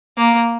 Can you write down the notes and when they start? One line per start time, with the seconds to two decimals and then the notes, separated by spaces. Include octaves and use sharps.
0.17 A#3